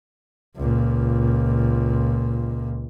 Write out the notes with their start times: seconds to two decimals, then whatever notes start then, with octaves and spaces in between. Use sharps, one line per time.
0.57 C#2 A#2